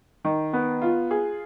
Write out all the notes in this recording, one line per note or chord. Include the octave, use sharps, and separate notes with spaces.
D#3
B3
F4
G#4